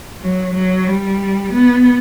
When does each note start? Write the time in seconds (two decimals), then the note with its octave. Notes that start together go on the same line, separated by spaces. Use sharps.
0.20 F#3
0.54 F#3
0.87 G3
1.53 B3